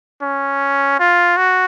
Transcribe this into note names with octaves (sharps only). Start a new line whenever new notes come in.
C#4
F4
F#4